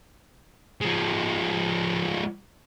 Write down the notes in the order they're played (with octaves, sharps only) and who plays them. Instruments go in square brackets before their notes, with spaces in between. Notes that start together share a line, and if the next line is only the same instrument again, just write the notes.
[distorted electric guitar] F3 G#3